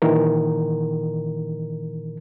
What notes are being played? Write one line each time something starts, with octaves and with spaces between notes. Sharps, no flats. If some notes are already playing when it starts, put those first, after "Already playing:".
A#2 D#3 E3 A#4